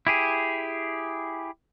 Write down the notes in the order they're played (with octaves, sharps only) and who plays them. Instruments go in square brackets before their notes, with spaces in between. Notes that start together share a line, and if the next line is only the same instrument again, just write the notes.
[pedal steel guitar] E4 G4 G#4